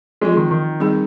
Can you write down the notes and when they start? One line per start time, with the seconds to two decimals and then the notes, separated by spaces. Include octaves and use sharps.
0.21 F3 G#3 C4 F4
0.36 D#3
0.51 D#3
0.80 G3 C4 D#4 G#4